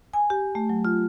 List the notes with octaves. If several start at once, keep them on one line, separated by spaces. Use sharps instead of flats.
G#5
G4
A3
F#3
F4